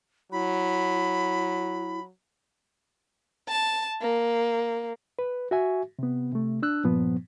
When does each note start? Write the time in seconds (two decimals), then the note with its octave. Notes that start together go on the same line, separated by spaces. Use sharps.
0.32 F#3 E4 B5
3.49 A5
4.01 A#3
5.19 B4
5.51 F#4 E5 G#5
5.99 C3 B3
6.32 C3 A3
6.62 D4 E6 F#6
6.84 G2 A#2 F3 B3